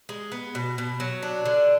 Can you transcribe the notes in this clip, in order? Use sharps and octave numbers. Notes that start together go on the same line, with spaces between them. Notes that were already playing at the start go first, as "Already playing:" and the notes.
G#3
B3
B2
B2
F#3
D4
D3